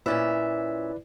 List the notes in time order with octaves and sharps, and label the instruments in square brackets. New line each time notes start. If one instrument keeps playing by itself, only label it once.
[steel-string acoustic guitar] A#2 C#4 E5 [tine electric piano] E4 B4 D5